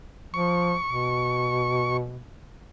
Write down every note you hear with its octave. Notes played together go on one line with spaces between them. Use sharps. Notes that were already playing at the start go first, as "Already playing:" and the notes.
F3 C#6
B2